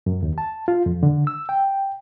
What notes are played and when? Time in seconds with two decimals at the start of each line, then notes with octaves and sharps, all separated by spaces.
0.06 F#2
0.23 D#2
0.38 A5
0.68 F4
0.86 F2
1.03 D3
1.27 E6
1.49 G5